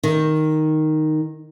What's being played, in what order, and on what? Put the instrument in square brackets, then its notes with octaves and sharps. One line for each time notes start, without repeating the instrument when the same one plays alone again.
[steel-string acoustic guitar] D#3